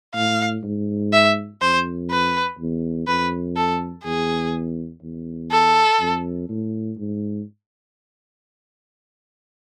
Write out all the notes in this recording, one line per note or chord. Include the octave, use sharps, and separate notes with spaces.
A2 F5
G#2
E5
F2 C5
B4
E2
F2 B4
A4
E2 G#4
E2
A4
F2
A2
G#2